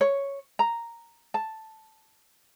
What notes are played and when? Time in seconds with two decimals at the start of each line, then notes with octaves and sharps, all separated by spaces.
0.01 C#5
0.59 A#5
1.34 A5